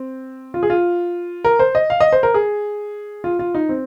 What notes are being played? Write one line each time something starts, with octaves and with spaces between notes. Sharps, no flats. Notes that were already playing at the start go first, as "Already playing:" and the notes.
Already playing: C4
F4
G#4
F4
A#4
C5
D#5
F5
D#5
C5
A#4
G#4
F4
F4
D#4
C4